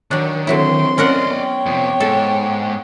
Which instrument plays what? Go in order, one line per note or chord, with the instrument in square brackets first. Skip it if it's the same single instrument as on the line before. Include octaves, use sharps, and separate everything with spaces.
[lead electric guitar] D#3 [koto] F#3 D4
[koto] D3 F#3 E4 [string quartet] C4 C6
[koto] C#4 A#4 F#5 [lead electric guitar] D5 D#5
[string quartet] B3 C#5 G5
[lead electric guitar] F2 C3
[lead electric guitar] G#2 [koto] A4